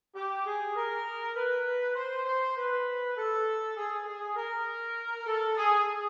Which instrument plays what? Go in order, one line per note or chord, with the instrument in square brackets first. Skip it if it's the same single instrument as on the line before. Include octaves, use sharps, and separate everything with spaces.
[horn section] G4
G#4
A#4
B4
C5
C5
B4
A4
G#4
G#4
A#4
A4
G#4